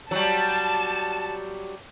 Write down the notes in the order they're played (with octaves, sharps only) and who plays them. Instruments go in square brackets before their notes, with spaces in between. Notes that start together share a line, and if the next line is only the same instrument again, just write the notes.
[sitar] F#3 G3 [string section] A5